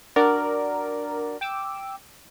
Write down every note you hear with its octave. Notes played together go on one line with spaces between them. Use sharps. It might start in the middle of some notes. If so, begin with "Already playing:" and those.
D4 F#4 A#4 D5
G5 D6 E6